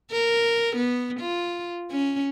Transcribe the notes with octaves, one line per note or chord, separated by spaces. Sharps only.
A#4
B3
F4
C#4